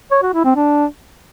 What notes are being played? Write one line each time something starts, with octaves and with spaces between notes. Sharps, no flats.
C#5
F#4
E4
C4
D4